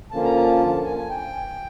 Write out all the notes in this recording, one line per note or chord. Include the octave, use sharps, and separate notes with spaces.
D3 F3 A#3 C#4 F4 A5
A#5
A5
G#5
G#5
G5